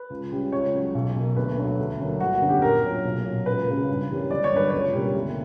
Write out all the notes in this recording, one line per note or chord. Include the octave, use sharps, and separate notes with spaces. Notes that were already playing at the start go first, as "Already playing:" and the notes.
Already playing: B4
C#2
C#3 G3
C#2 C#5
C#3 F#3
B1
B2 A#3
D2 B4
D3 F#3
D2
D3 F#3 A#3
G1 F#4
F#4
F#2 D3 F#3 B3
G4
A#1 A#4
A#2 F#3 C#4
B1
A#2 F#3 C#4
C#2 B4
C#3 F#3
G2
E3 G3 A#3 C#4
G1 D5
C#5
G2 D3 F#3 B4
C#2 C#5
B2 G3 A#3 C#4
D2